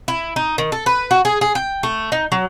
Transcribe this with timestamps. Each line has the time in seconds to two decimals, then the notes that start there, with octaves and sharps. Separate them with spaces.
0.08 E4
0.36 D#4
0.58 D#3
0.72 A4
0.86 B4
1.11 F#4
1.25 G#4
1.41 G#4
1.55 G5
1.83 A3
2.12 D#4
2.32 F#3